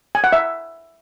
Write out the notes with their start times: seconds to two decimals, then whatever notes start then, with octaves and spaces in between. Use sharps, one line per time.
0.15 G#5
0.24 F#5
0.33 E5